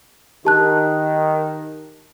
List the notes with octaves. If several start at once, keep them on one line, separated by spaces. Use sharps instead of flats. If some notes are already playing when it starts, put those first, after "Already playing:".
D#3 G4 A5 F#6